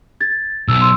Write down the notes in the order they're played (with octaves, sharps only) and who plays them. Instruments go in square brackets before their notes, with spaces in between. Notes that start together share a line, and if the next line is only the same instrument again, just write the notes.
[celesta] G#6 A6
[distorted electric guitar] B1 [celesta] E6
[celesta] C6 E6